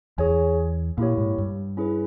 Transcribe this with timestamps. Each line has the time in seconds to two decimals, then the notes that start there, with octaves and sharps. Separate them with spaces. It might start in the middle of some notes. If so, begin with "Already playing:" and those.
0.18 E2 G#4 C#5 G#5
0.98 A#2 A#3 E4 G4 C#5
1.18 G#2
1.38 G2
1.77 C#4 E4 G#4 B4